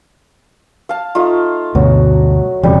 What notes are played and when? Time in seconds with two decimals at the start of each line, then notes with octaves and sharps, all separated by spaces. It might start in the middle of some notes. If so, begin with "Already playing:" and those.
0.89 F5 A5
1.15 A3 D#4 F4
1.75 D2 G2 B2 F#3
2.63 E1 F2 C#3 G3